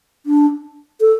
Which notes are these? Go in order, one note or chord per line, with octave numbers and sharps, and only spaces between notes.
D4
A4